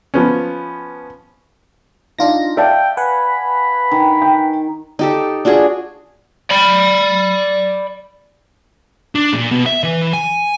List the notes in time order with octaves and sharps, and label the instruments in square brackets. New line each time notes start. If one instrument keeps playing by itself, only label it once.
[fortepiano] F3 B3 C#4
[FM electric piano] D4 F4 A#6 [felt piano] D#4
[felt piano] D5 F5 A5 [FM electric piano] E5 [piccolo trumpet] G5
[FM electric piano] B4 F#5 G#5 [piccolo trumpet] B5
[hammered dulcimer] D#3
[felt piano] G5
[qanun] D#4 G4 A4
D4 F4 F#4 G#4
[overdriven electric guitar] D5 B5
[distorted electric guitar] D4
A#2
B2
E5
E3
G#5